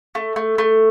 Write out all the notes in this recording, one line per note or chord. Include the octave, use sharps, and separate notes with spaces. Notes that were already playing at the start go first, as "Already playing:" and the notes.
A3
A3
A3